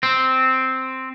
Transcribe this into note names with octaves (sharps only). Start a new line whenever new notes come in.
C4